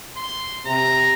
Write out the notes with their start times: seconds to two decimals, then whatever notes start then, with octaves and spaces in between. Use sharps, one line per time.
0.17 C6
0.67 C3 A#5